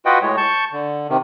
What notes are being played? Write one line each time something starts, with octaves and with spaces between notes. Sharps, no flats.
F4 F#4 B4 D#5 F#5 G5
A2 G#3 C#5
A5 C#6 G6
D3
C3 D#3